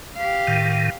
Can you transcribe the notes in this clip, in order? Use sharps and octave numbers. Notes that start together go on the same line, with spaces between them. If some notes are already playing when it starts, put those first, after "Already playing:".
G4 F5
A2 D#3